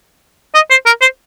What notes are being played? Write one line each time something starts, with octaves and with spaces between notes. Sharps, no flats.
D#5
C5
A#4
C5